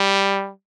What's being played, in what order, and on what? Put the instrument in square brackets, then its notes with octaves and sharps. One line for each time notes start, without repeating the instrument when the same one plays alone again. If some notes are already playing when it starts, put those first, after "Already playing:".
Already playing: [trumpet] G3